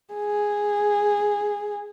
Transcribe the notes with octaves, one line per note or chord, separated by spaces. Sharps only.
G#4